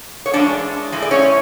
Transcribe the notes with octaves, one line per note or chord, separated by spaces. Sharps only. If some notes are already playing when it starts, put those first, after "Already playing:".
C#5
A2 E3 G#3 D4 D5
A2 E3 G#3
D5
C#4 C#5